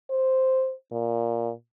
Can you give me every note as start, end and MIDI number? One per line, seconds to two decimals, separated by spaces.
0.10 0.73 72
0.92 1.51 46